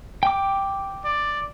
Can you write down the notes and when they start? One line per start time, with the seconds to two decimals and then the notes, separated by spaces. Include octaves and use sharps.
0.23 G5 D6
1.04 D5